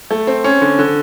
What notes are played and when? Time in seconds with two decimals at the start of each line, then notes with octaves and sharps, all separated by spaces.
0.11 A3
0.27 C4
0.44 C#4
0.61 D3
0.79 D3